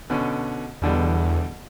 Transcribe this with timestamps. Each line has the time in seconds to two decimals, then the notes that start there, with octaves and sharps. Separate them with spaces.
0.10 B2 D3 C#4
0.82 E2 B2 D3 G3